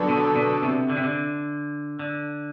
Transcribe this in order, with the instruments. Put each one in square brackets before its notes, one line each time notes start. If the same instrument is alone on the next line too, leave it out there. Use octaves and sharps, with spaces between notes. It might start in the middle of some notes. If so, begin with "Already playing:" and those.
Already playing: [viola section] D3 F#3 B3 F#4 A4
[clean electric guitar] B2
B2
C3
D3
C3
D3
D3